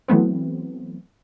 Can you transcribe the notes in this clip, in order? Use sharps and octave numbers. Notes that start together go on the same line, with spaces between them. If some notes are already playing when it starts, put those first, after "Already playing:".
E3 F#3 A3 B3 C4